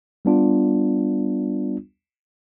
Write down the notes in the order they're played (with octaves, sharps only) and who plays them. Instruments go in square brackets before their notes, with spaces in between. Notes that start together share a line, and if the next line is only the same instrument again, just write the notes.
[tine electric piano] G3 B3 D4 F4